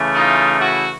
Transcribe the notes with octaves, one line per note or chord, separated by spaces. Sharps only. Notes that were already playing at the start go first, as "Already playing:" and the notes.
Already playing: C#3 E3 A3
D#4 F4
E4 F#4